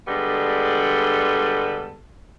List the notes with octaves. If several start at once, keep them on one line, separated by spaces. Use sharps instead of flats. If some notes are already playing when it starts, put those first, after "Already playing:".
D3 G3 G#3 B3 A4